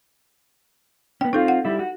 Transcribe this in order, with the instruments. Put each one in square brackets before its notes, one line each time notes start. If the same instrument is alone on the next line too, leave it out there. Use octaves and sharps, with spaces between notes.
[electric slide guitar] B3 C#4 [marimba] G5
[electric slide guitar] C4 F4 [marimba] D#4 A4
[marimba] F#5
[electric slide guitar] G3 E4
F#4